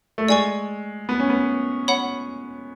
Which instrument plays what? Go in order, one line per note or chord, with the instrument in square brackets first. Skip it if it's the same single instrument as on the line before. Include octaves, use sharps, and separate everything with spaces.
[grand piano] A3
[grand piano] G#3 [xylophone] D5 G#5 C#6
[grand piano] B3
C#4
B3
[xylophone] C#5 F#5 B5